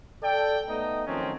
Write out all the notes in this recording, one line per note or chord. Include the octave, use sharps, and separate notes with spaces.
A4 D5 G5
A3 B3 D#4 D#5
D#3 F3 F#3 A3 C4 C#4